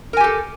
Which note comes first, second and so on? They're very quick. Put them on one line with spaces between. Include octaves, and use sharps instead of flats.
A#4 G#5 G4 A4